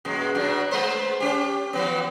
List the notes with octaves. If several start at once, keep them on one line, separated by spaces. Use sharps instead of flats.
F#2 A#2 G#3
B2 F#3 D4
G#3 B3 C5
C#4 G4
E3 F3 B3